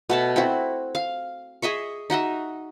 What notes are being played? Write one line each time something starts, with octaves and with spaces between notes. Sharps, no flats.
B2 A3 A5
C4 E4 F#4
F5
G#4 D#5 E5 C#6
D#4 F#4 D#5 E5